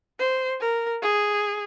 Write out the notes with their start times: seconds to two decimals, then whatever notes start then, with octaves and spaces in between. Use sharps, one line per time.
0.20 C5
0.60 A#4
1.02 G#4